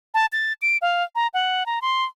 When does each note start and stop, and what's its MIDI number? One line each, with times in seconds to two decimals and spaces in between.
0.14 0.26 81
0.33 0.53 93
0.62 0.77 98
0.82 1.03 77
1.15 1.27 82
1.34 1.66 78
1.66 1.79 82
1.82 2.05 84